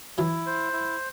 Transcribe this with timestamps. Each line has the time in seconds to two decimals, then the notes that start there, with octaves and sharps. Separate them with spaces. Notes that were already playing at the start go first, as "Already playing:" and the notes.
0.18 E3 F#3 E4
0.46 C5
0.73 E4